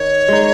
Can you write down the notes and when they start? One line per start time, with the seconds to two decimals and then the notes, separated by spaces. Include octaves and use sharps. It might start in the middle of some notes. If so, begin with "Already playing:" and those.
Already playing: D#3 C#5
0.28 G#3 D#4